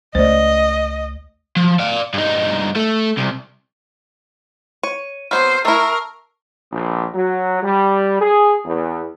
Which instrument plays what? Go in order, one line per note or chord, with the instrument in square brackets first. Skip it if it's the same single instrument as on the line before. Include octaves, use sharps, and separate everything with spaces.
[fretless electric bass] C#2 A3 [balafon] C5 D5 [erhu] D#5
[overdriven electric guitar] F3
D5 F5
G2 D#4
A3
C2
[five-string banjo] C#5 [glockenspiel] D#7
[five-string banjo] F#3 B3 C4 [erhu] C5 [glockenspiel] F6 C7
[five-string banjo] A3 E4 [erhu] A#4 [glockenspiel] A5 C#6 E6
[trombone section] A#1
F#3
G3
G#4
E2